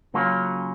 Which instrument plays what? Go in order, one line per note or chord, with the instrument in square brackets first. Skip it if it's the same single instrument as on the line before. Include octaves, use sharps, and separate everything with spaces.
[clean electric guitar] C#3 F#3 A#3 C#4 F4